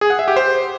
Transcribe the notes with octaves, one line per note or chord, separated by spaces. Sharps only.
G#4
F#5
E5
G4
C5